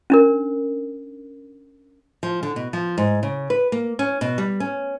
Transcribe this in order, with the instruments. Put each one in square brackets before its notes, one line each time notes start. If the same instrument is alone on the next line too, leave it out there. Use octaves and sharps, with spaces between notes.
[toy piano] C#4 D4 A#4
[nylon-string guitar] F3
D3
B2
F3
G#2
C#3
B4
A#3
C#4
B2
G3
C#4